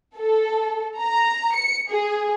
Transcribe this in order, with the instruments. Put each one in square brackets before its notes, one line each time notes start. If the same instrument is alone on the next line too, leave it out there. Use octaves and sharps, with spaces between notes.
[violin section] A4
A#5
C#7
G#4